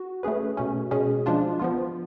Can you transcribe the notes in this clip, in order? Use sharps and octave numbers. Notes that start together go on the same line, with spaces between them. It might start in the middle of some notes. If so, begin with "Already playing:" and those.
Already playing: F#4
A3 C#4 G#4 B4
B2 A3 C#4
B2 G#3 C#4 G#4
F3 G#3 D4 F4
F3 B3 F4